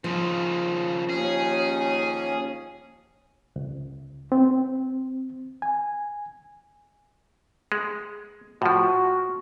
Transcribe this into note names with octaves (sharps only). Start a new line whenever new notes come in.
D#2 C#3 F3
D#2 C#4 G#4
C#2
C4
G#5
G#3
A2 F3 F#4